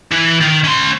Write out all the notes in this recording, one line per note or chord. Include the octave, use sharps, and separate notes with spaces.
E3
D#3
C#4 C6